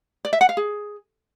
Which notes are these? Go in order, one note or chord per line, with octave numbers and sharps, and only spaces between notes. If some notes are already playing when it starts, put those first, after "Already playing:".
D5
E5
F#5
F5
G#4